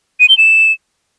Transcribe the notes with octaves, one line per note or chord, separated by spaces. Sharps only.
D#7
G7
E7